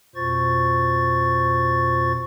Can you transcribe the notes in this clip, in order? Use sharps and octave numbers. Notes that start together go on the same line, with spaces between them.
F2 B2 F4 C5 C#6 A6